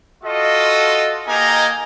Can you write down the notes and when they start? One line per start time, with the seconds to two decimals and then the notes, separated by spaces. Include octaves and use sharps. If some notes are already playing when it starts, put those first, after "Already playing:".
0.24 F4 F#4 A4 D#5
1.27 A#3 D#4 G4 D#5 G#5 A#5